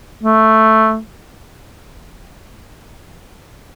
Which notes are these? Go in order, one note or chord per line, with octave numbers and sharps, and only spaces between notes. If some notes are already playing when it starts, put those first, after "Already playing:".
A3